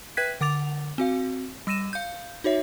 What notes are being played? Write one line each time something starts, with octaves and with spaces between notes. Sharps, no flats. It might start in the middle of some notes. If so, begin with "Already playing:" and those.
B4 E5 G5 F#6 G#6 B6
D3 F#5 D6 A6 F7
C4 F#4 F5
G3 E6 A#6 D#7 E7
F5 G6
D#4 F#4 C#5 E5